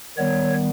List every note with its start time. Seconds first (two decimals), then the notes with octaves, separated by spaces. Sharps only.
0.18 D#3 G3 B3 C#5